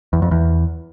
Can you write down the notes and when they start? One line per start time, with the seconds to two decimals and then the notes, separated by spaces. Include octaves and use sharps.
0.13 E2
0.22 F2
0.31 E2